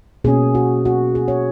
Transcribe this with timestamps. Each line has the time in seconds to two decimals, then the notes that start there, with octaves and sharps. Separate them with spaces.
0.24 B2 A#3 C#4 G#4
0.55 F#4
0.85 F#4
1.15 G#4
1.28 C#5